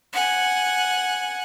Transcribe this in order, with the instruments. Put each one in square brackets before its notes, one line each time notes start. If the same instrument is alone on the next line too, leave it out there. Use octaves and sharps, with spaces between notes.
[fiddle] F#5 G#5